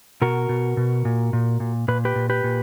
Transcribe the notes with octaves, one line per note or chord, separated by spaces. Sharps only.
B2 F#4 A#4
B2
B2
A#2
A#2
A#2
A#2 B4
G4 B4
A#2
G4 B4
A#2